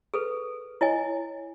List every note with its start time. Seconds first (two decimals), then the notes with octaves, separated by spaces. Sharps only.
0.14 G#4 A4 B4
0.81 E4 C#5 D#5 G#5